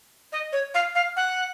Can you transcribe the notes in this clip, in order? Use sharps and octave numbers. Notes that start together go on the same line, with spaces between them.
D#5
C#5
F5
F5
F#5